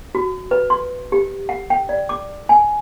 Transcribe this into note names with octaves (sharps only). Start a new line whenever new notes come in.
F#4
B4
C6
G4
F#5
G5
D5
D6
G#5